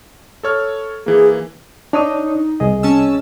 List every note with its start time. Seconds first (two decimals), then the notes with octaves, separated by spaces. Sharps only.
0.43 A4 C#5 F6
1.06 E3 A#3 G#4
1.93 D4 D#4 C#5 D#6
2.60 C2 G#4 D#5
2.83 C#4 A5 E6